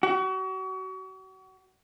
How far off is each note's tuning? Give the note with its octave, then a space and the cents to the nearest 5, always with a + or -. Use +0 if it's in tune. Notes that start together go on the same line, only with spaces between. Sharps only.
F#4 +35